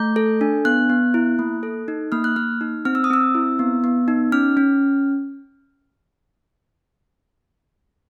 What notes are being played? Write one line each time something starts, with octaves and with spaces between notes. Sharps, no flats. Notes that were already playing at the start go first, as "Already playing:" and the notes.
Already playing: A3 G6
A4
D4
B3 F#6
B3
E4
A#3
A4
D#4
A#3 F6
F#6
A#3 F6
D#4
C4 F6
E6
D#6
C4 E6
E4
B3
B3
D#4
C#4 F6
C#4